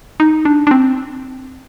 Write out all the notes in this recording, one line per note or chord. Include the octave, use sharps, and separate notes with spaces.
D#4
D4
D4
C4